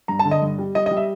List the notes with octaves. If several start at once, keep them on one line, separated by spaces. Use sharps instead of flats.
G2 A#5
A5
D3
D#5
G2
G3
G3 D#5
G3 D#5
E5